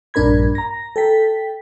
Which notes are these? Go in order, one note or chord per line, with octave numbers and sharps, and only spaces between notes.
A#1 G2 D4 A#4 B5 G#6
A#5 A#6
A4 G5 B6